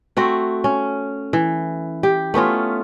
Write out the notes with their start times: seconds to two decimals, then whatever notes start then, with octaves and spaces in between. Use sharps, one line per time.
0.17 A3 C4 F#4
0.64 C#4
1.33 E3
2.03 G4
2.34 A3 B3 C#4 F4